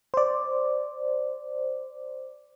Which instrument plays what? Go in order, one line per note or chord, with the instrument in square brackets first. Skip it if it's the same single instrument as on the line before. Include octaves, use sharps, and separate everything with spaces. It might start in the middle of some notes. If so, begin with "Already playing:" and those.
[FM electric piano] C5 D5